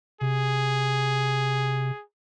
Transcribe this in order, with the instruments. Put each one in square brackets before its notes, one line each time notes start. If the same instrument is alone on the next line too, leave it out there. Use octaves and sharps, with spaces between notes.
[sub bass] C3 [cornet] G#4